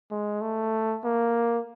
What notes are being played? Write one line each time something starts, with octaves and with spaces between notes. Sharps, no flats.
G#3
A3
A#3